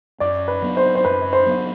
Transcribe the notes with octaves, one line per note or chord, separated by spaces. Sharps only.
F#2 D5
B4
F#3 B3 D4
C5
C5
F#2 B4
C5
F#3 B3 D4